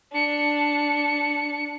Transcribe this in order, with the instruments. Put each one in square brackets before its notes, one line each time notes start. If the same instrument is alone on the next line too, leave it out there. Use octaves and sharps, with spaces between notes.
[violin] D4 C#7